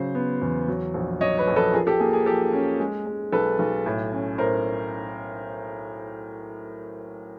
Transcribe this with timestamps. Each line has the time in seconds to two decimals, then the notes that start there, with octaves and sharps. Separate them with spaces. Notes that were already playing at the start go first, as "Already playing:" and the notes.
Already playing: C#3 F#3 C5
0.15 B3
0.41 E2
0.68 F#3
0.94 A#1
1.21 F#3 C#5 D#5
1.38 B4 C#5
1.47 A#1
1.56 A4 B4
1.73 F3 G#4 A#4
1.87 G4 A4
2.00 A#3 G#4
2.13 G#4
2.26 F3 G4 A4
2.53 C#4
2.80 G#3
3.06 G#3
3.32 B1 A4 B4
3.59 B1
3.86 A2
4.12 C#4
4.38 A2 A#4 C5